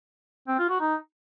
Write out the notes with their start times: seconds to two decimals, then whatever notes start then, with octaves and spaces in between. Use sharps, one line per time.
0.48 C4
0.58 F4
0.69 F#4
0.80 D#4